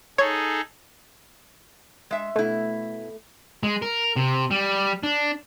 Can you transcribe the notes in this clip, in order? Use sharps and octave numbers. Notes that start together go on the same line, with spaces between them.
D#4 G#4 A4 C#5
G#3 E5
B2 A3 E4
G#3
A#4
C3
G3
D4